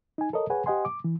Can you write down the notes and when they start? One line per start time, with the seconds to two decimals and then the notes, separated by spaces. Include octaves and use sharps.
0.18 D#4 G#5
0.33 A4 A#4 C#5 D#5
0.50 G#4 B4 C#5 F#5 G#5
0.66 G4 C5 D#5 F#5 G#5 C6
0.85 D6
1.04 E3